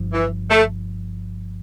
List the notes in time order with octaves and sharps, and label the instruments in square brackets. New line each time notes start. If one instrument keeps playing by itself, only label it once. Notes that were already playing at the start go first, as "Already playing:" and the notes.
Already playing: [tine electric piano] G1 G2 F3
[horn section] E3
A3